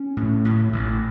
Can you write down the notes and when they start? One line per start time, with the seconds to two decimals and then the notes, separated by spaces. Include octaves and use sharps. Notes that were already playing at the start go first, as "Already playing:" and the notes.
Already playing: C#4
0.17 A2
0.45 A2
0.73 A1